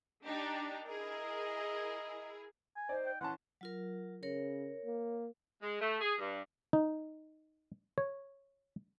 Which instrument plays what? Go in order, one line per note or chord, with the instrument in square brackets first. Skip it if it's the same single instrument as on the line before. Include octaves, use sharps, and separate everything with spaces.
[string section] D4 D#4 G4
[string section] E4 G#4 A#4 [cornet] D#5
[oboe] G#5
[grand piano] D#4 D5 [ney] C5
[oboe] G5
[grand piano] E3 C#4 A5 [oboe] F#5 [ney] C6
[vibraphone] F#3 F4 A#4
[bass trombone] C#3 [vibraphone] A#4 C#5
[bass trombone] A#3
[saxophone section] G#3
A3
G#4
G2
[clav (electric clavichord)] D#4
C#5